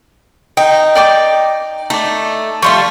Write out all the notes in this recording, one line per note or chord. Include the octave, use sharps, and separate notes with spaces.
D#4 G5
D5 G5 D6
A3 D#4 D5
F3 G3 A3 C6 C#6